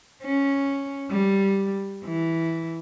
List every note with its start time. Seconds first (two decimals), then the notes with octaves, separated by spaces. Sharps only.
0.22 C#4
1.11 G3
2.05 E3